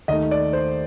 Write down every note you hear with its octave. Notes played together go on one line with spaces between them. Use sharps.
D#2 D#3 A3 D#5
D5
C5